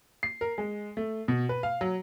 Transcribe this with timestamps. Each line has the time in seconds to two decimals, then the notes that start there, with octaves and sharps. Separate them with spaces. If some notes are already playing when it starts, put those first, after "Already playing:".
0.23 C7
0.41 A#4
0.58 G#3
0.97 A3
1.28 B2
1.49 B4
1.63 F5
1.81 F#3